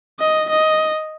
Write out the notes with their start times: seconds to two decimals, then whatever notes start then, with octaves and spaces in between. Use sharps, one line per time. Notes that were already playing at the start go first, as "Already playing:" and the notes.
0.20 D#5
0.50 D#5